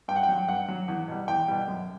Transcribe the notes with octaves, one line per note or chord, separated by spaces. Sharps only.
G2 G5
F#5
G5
F#3
G2 F#5
F#3
E2
B2 G3
E2 G5
B2 G3
F#2